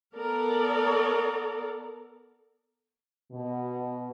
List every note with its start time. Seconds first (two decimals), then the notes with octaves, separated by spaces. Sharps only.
0.16 B3 A4 A#4 D5
3.32 B2